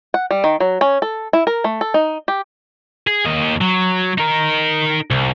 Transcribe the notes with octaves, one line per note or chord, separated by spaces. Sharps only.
F#5
G3
D#3
F#3
C#4
A4
E4
A#4
A3
A4
D#4
G4
G#4
D#2 D#5
F#3
D#4 A#4
C2